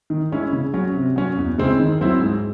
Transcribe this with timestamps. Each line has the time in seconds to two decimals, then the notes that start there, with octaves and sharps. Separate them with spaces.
0.10 D#3
0.32 G#3 C#4 E4
0.53 C#3
0.74 F#3 C#4
0.95 C3
1.16 F#3 C#4
1.37 E2
1.58 C#3 G#3 C4 E4
1.79 D#3
2.01 F#3 C4 E4
2.22 G#2